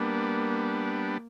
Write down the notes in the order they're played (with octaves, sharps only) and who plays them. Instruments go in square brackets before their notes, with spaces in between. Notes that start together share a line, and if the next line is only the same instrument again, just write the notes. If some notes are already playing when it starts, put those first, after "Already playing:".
Already playing: [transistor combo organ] G3 B3 D4 [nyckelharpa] A#3